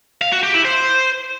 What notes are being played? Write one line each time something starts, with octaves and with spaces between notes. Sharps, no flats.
F5
F#4
G4
E4
C5